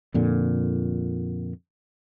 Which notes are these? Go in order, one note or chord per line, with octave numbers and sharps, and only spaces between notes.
F2 A#2 D3